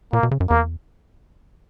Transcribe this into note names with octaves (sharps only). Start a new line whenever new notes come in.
A#2 A#3
B2
C#3
F#2
E2 A#3